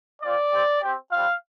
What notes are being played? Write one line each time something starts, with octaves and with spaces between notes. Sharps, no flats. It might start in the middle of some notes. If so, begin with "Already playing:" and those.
C4 F4 D5
C4 G4
C4 G4
G3 C4 F4 F5